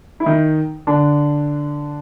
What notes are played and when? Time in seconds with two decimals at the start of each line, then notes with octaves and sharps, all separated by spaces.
0.20 E4
0.26 D#3 D#4
0.87 D3 D4